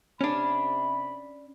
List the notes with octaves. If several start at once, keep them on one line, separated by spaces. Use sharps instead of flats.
C3 C#4 D4 B5